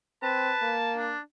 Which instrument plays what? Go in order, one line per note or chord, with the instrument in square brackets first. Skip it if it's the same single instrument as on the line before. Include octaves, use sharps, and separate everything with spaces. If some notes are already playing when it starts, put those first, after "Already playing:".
[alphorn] C4 [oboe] B4 [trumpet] A5
[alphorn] A#3
[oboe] D4